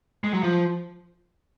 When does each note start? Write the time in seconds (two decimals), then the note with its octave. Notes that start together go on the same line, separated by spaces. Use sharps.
0.24 G#3
0.33 F#3
0.43 F3